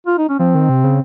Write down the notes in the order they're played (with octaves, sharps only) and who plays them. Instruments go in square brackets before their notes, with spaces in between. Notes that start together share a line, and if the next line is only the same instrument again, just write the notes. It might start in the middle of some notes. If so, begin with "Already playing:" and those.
[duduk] F4
D#4
C#4
[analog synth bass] F3 [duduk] C4
[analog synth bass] D#3
C3
C#3